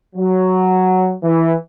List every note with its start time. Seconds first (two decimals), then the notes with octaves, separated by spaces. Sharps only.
0.15 F#3
1.23 E3